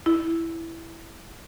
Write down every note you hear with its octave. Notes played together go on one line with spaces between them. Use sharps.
E4